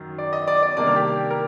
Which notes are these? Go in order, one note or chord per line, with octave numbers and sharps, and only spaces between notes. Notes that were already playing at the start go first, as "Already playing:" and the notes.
Already playing: F#2 D#3 F#3
D5
D#5
D5
D5
C3 D#3 G3 A#3 D4 D5
A#4
G4
A#4